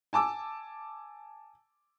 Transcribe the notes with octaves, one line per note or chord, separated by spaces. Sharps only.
G#5 A5 D6 E6